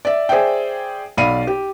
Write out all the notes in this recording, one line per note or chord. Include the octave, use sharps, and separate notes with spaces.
D5 E5
G#4 C5 D5 E5 G5
B1 D5 F5 B5 D#7
G4